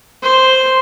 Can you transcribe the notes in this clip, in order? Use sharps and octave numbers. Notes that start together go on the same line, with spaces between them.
C5